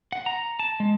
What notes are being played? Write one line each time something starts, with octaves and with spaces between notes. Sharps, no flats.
F#5
A#5
A5
G#3